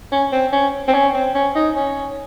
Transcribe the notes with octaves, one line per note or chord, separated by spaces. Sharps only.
C#4
C4
C#4
C4
C#4
C4
C#4
D#4
C#4